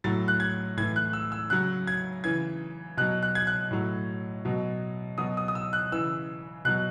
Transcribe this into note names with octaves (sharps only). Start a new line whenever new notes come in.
A2 F#3 A6
F#6
G#6
A2 E3 G#6
F#6
E6
E6
C#3 F#3 F#6
G#6
C#3 E3 G#6
B2 F#3 F#6
F#6
G#6
F#6
A2 F#3
B2 F#3
B2 F#3 D#6
D#6
D#6
E6
F#6
C#3 E3 E6
B2 F#3 F#6